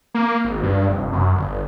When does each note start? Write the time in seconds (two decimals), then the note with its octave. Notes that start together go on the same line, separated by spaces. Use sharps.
0.14 A#3
0.45 G#1
0.63 G2
0.89 F1
1.13 F#2
1.36 G1